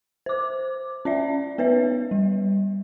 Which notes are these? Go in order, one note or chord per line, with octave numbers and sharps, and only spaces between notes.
C5 D6
C#4 D5 E5
B3 B4 C#5 E5
G3